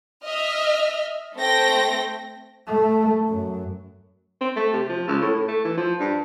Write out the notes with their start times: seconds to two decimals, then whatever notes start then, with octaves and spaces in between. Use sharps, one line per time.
0.24 D#5 E5 F6
1.36 A3 C4 G5 A#6
2.67 A3
3.28 F#2
4.41 C4
4.56 A3
4.73 C3
4.89 F3
5.08 C#2
5.21 A2
5.34 A2
5.48 A3
5.65 E3
5.77 F3
6.00 G2